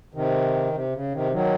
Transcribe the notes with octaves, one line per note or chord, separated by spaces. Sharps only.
C3 D#3
C3
C#3
C3 D#3
D#3 F#3